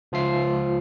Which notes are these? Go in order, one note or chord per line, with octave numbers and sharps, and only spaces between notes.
C#2 F3 F4 E5 C7